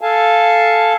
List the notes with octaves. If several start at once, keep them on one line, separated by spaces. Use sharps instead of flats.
A4 F5 G#5 A5